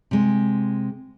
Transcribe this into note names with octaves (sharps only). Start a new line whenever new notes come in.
C3 G#3